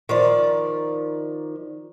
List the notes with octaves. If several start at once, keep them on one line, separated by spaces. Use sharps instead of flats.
D#3 F3 D5